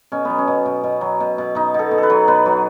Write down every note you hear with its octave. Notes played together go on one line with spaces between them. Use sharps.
B2 C#4
F#3 B3
C#4
B2
B2
B2
F#3
B2
B2
B2 D#4
B2 A4
B2
A4 B4
F#3
B2 B4
F#3